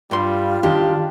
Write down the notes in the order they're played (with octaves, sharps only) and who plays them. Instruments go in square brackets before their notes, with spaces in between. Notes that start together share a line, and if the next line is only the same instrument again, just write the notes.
[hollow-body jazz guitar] G2 C6 [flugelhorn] G3 [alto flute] F4
[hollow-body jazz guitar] D#3 [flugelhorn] D4 [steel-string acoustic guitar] G4